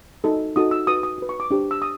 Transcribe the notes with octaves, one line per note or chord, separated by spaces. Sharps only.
D#4 F#4 A4
D#4 F#4 A4 D#6
E6
F#4 B4 D#6
D#6
F#4 B4
C#6
D6
D4 G4 C5
E6
D#6